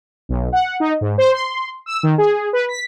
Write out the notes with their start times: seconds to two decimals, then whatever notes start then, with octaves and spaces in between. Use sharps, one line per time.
0.29 B1
0.52 F#5
0.80 D#4
1.01 G#2
1.18 C5
1.32 C6
1.86 E6
2.03 D#3
2.18 G#4
2.53 B4
2.69 B6